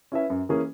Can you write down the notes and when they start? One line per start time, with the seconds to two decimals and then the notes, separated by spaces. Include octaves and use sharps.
0.12 C#4 E4 B4 E5
0.30 F#2
0.49 E3 A#3 C#4 G#4